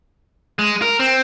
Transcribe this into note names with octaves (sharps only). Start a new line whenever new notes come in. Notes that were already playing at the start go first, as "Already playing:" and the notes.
G#3
A#4
C4